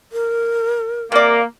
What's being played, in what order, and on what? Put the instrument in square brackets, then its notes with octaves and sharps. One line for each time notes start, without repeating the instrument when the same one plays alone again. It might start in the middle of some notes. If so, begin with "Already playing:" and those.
[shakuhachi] A#4
[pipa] C3 D5 [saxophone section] A#3